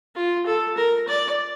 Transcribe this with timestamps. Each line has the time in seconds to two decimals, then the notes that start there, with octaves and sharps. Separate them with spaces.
0.15 F4
0.46 A4
0.77 A#4
1.08 D5